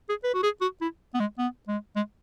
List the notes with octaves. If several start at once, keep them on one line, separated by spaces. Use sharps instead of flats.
G#4
B4
F#4
G#4
F#4
E4
B3
G#3
B3
G#3
G#3